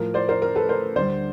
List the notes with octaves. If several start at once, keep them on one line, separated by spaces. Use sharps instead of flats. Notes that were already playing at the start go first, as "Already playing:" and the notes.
Already playing: A2 F3 A#4
C5 D5
A#4 C5
A#4
A4 B4
A#4 C5
D2 D3 G3 C5 D5